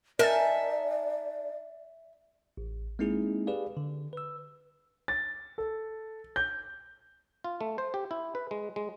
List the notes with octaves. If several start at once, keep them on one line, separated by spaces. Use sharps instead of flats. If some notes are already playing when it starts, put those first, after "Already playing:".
D#4 A#4 D5 E5 G#5 A5 F6 A6
A1
G#3 A#3 C4 D#4 E4 G#4
G4 G#4 B4 D5 F5
D3
B4 E6
A6
A4
G6
F4
A3
C5
G4
E4
B4
G#3
G#3